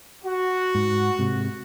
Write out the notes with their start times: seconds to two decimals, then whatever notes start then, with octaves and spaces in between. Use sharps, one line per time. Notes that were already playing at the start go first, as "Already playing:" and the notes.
0.24 F#4
0.75 G#2
1.19 G#2 C3